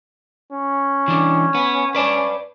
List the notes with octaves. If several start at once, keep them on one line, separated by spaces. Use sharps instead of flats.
C#4
E3 D4
B3
B4 D5 A5